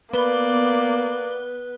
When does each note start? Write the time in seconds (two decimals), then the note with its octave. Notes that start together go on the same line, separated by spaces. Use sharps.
0.13 A#3 B3 B4 D5 G7